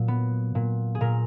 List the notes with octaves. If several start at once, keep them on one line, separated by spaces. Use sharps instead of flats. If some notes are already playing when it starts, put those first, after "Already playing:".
Already playing: A#2 F#3
B3
A#2
G#4
A#2 A#4